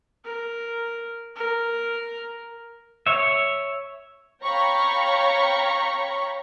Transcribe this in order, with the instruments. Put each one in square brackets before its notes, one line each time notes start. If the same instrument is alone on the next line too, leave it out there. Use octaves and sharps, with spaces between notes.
[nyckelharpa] A#4
A#4
[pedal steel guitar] C#5 E5
[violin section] C#5 F5 G5 A#5 B5 C#6